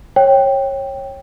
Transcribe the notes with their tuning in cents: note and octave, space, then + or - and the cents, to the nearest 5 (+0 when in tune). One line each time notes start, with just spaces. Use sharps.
C#5 -20 G5 +0